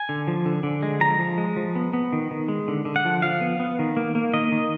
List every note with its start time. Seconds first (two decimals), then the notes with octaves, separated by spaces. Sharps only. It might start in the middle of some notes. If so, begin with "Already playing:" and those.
Already playing: G#5
0.09 D3
0.28 F3
0.46 D3
0.63 D3
0.83 G#3
1.00 F3 A#5
1.19 F3
1.38 G#3
1.57 F3
1.75 B3
1.93 B3
2.13 D#3
2.31 D#3
2.48 G#3
2.68 D3
2.85 D3
2.96 F#5
3.05 F3
3.22 F3 F5
3.41 B3
3.60 B3
3.79 D#3
3.97 A#3
4.15 A#3
4.33 D#3 D#5
4.52 D#3